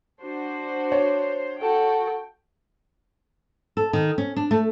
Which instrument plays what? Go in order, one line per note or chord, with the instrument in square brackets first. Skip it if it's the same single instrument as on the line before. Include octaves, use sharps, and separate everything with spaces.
[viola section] D4 F#4 C5
[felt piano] C#5
[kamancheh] F#4 A4 [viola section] G5
[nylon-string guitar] A4
D#3
C#4
D4
A3